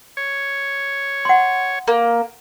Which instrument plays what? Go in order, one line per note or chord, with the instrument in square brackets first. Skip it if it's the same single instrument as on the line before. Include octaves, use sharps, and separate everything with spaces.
[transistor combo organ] C#5
[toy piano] F#5 C6
[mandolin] A#3